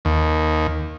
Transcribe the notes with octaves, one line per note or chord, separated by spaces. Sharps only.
D#2